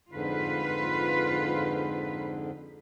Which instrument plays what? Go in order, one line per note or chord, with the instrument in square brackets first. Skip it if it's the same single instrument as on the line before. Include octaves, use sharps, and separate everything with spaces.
[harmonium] F2 G#2 D3 [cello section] F4 B4